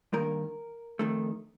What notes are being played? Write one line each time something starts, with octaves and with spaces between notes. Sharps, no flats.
G2 D#3 A#3 A#4
F2 D#3 A3